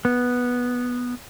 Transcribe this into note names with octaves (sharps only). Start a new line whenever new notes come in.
B3